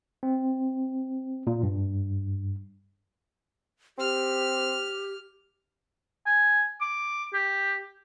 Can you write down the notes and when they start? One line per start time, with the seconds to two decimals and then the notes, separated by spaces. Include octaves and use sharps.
0.23 C4
1.47 A#2
1.63 G2
3.98 C4 G4 F6
6.26 G#5
6.81 D6
7.34 G4